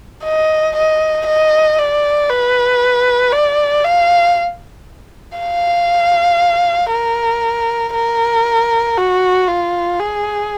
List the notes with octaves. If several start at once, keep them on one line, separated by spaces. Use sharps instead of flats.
D#5
D#5
D#5
D5
B4
D5
F5
F5
A#4
A#4
F#4
F4
G#4